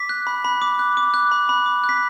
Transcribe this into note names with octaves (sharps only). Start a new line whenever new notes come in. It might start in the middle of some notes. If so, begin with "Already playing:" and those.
Already playing: D6 B6
F#6
B5
B5
D6
F#6
D6
F#6
B5
B5
D6
F#6
B6